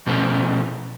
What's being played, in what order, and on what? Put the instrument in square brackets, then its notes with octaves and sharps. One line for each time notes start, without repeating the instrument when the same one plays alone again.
[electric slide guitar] B2 F3 A3 C#4